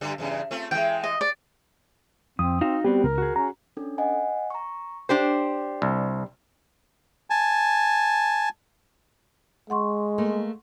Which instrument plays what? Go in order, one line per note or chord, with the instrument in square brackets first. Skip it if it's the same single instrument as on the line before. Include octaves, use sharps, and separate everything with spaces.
[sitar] G2 D3 G3
E2 G2 C#3
A3 C4 F4
[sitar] E3 G#3 [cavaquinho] G5
[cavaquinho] D#5
D5
[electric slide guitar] F2 [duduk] C4 [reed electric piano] D#6
[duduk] C4 [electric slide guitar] D#4 F#4 F5
[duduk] G3 [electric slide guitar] B3 C4 F#4 [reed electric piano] G4
[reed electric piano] C#2 [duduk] A#4
[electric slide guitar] F#4 G#4
[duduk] C#4 [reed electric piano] A#5
[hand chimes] C#4 D4 A4
D#5 F#5 G#5
A#5 C#6
[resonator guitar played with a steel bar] D4 G4 C5 [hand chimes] G5 G6
[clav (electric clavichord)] C2
[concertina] G#5 A5
[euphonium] G#3 [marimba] F#5 C6 C#6
[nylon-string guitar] A3 A#3